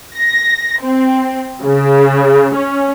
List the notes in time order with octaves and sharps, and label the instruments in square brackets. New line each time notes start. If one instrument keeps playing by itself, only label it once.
[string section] A#6
C4
C#3
C#4